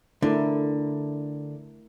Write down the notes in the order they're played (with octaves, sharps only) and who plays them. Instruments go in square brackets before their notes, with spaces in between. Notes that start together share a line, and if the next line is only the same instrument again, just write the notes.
[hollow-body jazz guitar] D3 [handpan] A3 E4 A#4